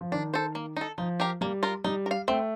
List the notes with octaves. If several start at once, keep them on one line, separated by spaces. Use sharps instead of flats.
F3
D#3 D4
A4 C5
A#3
D#4 A4
F3 D#4
G4 A#4 F5
G3 A#3
F4 A#4
G3 D#4
A#4
F5
A3 C4